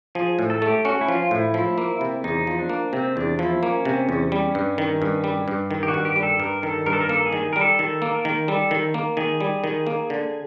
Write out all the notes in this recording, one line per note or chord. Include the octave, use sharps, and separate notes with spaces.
F3 G#4
A2
A4
A3
G4
C#4 F#4
E4
F3 F4
A2 E4
F3 E4
A#3
C3
E2 D#4
F3
D4
A#3
C3 C4
E2 D4
F3 E4
A#3 C#4
C3
E2
G3
G2
D#3
G2
G3
G2
D#3
G4
F#4
G2
G4
G3
A4
G2 A#4
D#3 A4
G2 A#4
A4
A#4
A#3 A4
G#4
D#3
A#4
G3
A4
D#3 A4
A#3
A#4
D#3
G3 A4
D#3
A#3
D#3 G#4
G3
D#3
A#3
D3